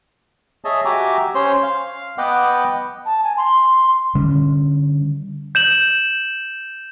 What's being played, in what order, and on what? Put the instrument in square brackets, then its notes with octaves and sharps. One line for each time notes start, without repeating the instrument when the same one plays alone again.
[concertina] G#4 C#5 D#5 E5 A5
F#4 G4 E5 G#5 A#5 D6
C#4 C5 C#5 C6
F5
B3 B4 D#5 F#5 G5 D6
[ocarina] A5
G#5
C6
[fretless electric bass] D3 G3 C#4
[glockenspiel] G6 E7 F#7